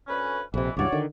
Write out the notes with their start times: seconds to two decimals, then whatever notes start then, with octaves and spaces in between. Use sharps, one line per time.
0.08 D2 C#4 B4
0.54 A#1 F2 C3 E3
0.77 C#2 G2 E3 F#4 C#5 D5
0.92 D3 D#3